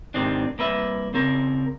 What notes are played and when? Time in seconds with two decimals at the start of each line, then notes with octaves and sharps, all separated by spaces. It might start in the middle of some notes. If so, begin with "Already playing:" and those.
0.14 G#2 C3 D#3 C4 D4
0.58 C2 A#3 B4 E5
1.14 C#3 C4 A#4